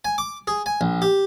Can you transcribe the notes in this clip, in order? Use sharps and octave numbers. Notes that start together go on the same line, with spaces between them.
G#5
D6
G#4
G#5
A#1
G4